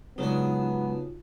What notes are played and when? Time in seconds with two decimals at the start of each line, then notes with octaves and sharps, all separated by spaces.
0.18 G#2 C#3 F#3 B3 D4 D#4 F4 F#4